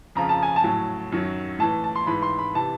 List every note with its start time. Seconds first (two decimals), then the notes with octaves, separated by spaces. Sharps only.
0.15 F2 C#3 F3 A#5
0.29 A5
0.43 G#5
0.56 A5
0.64 A2 F#3
1.12 F#2 D#3 F#3
1.59 A2 E3 A5
1.84 A5
1.95 C6
2.06 G#2 E3 B5
2.22 C6
2.39 B5
2.54 C3 E3 A5